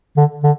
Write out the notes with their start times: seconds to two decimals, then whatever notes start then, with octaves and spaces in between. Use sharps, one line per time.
0.17 D3
0.43 D3